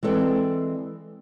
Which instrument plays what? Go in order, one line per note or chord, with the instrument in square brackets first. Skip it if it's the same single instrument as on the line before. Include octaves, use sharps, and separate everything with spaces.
[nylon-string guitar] E3 G#3 C4 A4 D5 G5